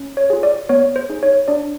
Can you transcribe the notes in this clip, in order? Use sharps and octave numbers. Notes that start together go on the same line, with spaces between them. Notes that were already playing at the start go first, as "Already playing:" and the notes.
Already playing: C#4
C#5
F4 G#4
D5
B3 C#5
C5
D#4 G#4
C#5
D4 D5